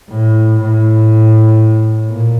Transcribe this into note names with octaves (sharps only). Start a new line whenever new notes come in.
A2
A2
A#2